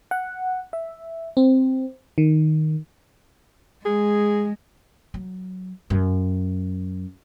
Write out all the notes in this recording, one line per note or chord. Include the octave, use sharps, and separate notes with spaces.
F#5
E5
C4
D#3
G#3 G#4
F#3
F#2